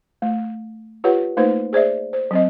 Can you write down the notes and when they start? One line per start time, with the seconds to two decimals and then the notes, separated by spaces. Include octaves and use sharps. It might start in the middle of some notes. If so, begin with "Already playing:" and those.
0.22 A3
1.04 F4 G4 B4 C#5 F#5
1.37 A3 A#3 D#4 B4 C5
1.73 G#4 C5 D5 E5
2.13 C5
2.31 F#3 C4 D#5